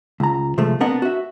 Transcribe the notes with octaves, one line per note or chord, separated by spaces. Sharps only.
C#2 A#5
C3 F3 G#3 A3
B3 C4 D4 A#4 D#5 F#5
F#4 E5